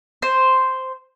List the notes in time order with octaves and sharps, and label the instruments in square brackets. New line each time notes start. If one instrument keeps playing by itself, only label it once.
[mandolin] C5